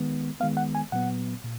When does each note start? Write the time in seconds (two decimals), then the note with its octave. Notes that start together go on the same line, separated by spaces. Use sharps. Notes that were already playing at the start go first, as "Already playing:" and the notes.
Already playing: D#3 G#3 B3
0.40 D#3 G#3 B3 F5
0.57 F#5
0.75 G#5
0.92 A#2 F#3 B3 F#5
1.44 A#2